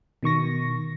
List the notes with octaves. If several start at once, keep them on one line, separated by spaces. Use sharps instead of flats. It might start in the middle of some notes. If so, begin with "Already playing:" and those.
B2 D#3 C#6 A#6